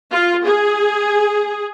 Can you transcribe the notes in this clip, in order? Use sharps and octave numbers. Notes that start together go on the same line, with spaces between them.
F4
G#4